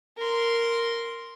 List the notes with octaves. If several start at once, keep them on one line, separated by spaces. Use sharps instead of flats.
A#4 C6